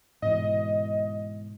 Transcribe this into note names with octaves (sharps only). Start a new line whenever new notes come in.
G#2 B2 E3 D#5